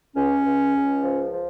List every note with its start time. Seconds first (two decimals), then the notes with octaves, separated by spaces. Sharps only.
0.16 C#2 C#4
0.45 C#2
0.75 C#2
1.03 F3
1.33 F3